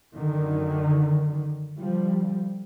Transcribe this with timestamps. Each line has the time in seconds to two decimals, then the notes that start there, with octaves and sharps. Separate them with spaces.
0.15 F#2 D3 D#3
1.78 D3 F3 G3